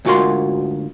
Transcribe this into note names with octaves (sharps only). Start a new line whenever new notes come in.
D2 G#2 F4 F#4 A#4 C6